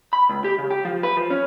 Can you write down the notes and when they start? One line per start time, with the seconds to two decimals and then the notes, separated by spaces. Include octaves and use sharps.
0.13 B5
0.29 C#2
0.44 G4
0.58 C#3
0.71 G4
0.85 F3
1.03 B4
1.17 F3
1.30 C#4